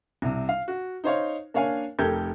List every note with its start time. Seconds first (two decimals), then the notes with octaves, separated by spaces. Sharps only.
0.22 C2 C3
0.49 F5
0.68 F#4
1.04 D#4 C5 C#5 F5
1.54 A#3 D4 C#5 F5 G#5
1.99 F1 G4 A4 A#4 G6 G#6